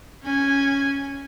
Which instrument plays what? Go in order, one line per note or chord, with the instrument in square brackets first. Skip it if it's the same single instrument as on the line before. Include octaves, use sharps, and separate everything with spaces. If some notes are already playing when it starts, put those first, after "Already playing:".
[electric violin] C#4 G#5